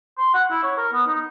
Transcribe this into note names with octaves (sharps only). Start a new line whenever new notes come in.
C6
F#5
E4
C#5
A#4
B3
D#4